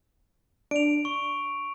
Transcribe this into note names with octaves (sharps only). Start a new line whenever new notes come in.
D4 D7 F7
C#6